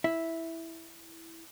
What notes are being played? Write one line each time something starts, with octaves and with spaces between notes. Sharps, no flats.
E4 E5